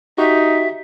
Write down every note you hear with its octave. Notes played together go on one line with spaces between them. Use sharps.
D#4 F#4 G4 E5